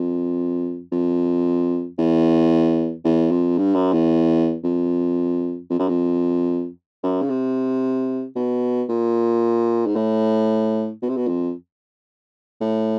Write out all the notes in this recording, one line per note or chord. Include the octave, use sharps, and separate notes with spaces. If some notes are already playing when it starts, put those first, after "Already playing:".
Already playing: F2
F2
E2
E2
F2
G2
F#2
E2
F2
F2
F#2
F2
F#2
C#3
C3
B2
A#2
G#2
A2
B2
C3
B2
F2
A2